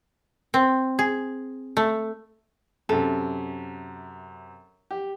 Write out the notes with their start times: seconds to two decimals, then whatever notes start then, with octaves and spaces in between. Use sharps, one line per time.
0.54 C4
0.99 G#4
1.77 A3
2.89 F#2 C3 A4
4.91 G4